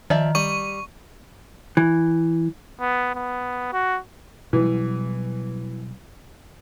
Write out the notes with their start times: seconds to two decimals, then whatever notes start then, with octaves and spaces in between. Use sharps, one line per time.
0.10 D#3 F3 D5 E5
0.35 G3 C#6 D#7
1.77 E3
2.81 B3
3.15 B3
3.73 F#4
4.53 B2 E3 F#3 G3